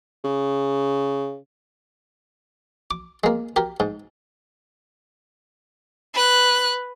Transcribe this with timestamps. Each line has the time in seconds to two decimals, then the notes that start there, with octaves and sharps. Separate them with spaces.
0.24 C#3
2.91 D6
3.24 G#3 A#3
3.56 G4 A#4
3.80 G#2
6.14 B4 F#6